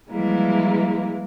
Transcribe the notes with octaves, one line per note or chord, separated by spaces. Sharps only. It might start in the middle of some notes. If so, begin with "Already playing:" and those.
E3 F3 G3 G#3 A#3 E4